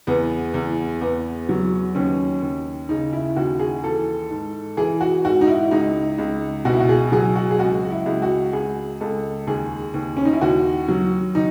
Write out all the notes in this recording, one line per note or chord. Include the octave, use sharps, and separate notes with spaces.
E2 B3
E2
E2 B3
F#3
D#2 C#4
D#2
C#3 D#4
E4
D#2 F#4
G#4
E3 A4
G#2
E3 G#4
F#4
G#2 F#4
D#4
E4
C#2 D#4
C#2
B2 F#4
E4
F#4
G#4
F#3 G#4
F#4
G#4
C#2 F#4
E4
C#2
F#4
C#2 G#4
C#2 A4
D#2 G#4
D#2
C#4
D#4
E4
D#2 F#4
F#3
D#3 D#4